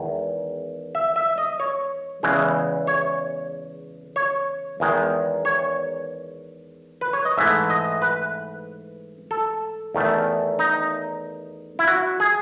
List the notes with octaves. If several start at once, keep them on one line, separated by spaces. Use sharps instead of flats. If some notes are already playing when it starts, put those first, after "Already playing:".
Already playing: E2 D#3 G#3
E5
E5
D#5
C#5
E2 C#3 E3 G#3
C#5
C#5
E2 D#3 G#3
C#5
B4
C#5
D#5
G#2 E3 A3 E5
D#5
B4
A4
E2 D#3 A3
D#4
E4
F#4
G#4